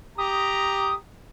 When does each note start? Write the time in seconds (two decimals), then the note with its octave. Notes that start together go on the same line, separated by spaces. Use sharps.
0.18 G4 A#5 D#6